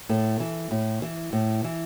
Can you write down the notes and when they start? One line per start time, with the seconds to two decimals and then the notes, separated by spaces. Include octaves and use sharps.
0.09 A2 A4
0.40 E3
0.71 A2
1.02 E3
1.33 A2
1.64 E3